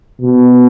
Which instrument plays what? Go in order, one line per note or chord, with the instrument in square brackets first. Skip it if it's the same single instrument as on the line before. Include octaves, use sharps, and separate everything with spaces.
[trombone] B2